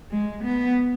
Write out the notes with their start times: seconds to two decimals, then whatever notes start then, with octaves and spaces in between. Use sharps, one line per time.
0.11 G#3
0.44 B3